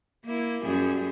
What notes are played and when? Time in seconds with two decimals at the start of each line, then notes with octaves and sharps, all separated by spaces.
0.25 A#3 E4
0.64 F#2 G3 G#4